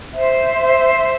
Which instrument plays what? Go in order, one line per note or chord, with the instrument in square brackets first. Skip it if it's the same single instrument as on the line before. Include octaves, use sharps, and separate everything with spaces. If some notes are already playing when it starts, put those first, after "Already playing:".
[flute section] C5 E5